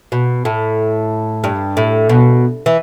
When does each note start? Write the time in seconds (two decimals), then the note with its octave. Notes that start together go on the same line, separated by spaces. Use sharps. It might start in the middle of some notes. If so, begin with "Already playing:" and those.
0.12 B2
0.45 A2
1.44 G2
1.77 A2
2.09 B2
2.66 E3